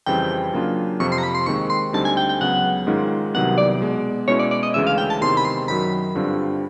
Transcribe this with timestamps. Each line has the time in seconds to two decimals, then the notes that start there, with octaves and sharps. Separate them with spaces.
0.06 F2 C#3 E3 G3 C4 G5
0.53 C#3 F#3 A#3 D4 F4
1.00 F2 C3 F3 C#6
1.12 C6
1.18 A#5
1.23 B5
1.35 C6
1.46 D#2 D#3 G#3 C4 C#6
1.70 C6
1.93 D2 D3 G3 C4 D#4 A5
2.05 G#5
2.17 G5
2.29 G5
2.41 C#2 C#3 F#3 B3 F#5
2.87 G#2 D#3 G#3 C#4 F4
3.34 C2 C3 D#3 F#3 B3 F#5
3.58 D5
3.80 B2 G#3 B3
4.28 B2 G#3 C#4 E4 C#5
4.39 D5
4.51 D5
4.63 D#5
4.74 D2 C#3 E3 G#3 C#4 E5
4.87 F5
4.98 G5
5.10 A5
5.21 E2 C3 D#3 G#3 C4 C6
5.37 B5
5.45 C6
5.68 F#2 D#3 F#3 B5
6.15 G2 D3 G3 C4 F4